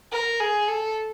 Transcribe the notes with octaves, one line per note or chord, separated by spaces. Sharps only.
A#4
G#4
A4